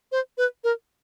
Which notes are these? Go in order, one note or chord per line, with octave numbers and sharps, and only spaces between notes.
C5
B4
A#4